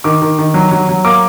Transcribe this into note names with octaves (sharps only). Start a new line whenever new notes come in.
D#3 D6
D#3
D#3
F#3
F#3
F#3
A#3 D6